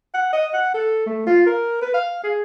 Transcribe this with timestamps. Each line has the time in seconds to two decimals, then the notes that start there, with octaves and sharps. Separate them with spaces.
0.14 F#5
0.33 D#5
0.54 F#5
0.74 A4
1.06 A3
1.26 F4
1.46 A#4
1.82 B4
1.94 F5
2.23 G#4